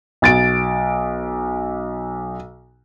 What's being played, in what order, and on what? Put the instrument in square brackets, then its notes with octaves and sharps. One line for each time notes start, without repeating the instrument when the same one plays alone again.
[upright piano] B1 A6 D7